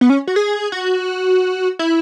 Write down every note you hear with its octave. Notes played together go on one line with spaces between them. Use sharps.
B3
C#4
F#4
G#4
F#4
E4